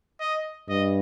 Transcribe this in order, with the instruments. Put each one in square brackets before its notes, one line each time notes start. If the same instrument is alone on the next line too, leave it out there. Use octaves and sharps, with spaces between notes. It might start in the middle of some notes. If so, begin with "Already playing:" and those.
[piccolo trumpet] D#5
[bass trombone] G2 [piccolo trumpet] D#5